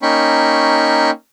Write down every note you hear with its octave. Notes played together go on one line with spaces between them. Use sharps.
A#3 C#4 D#4 G5 B5 C#6